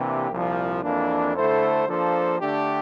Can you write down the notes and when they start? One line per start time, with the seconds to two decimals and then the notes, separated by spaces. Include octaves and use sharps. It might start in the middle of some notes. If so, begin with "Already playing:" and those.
Already playing: C3 E3 A#3 D4 G4
0.30 C2 A#2 F3
0.83 F2 E3 A#3 D4
1.35 D3 A3 E4 A4 C5
1.87 F3 A#3 D4 A4 C5
2.39 D3 A3 D4 G4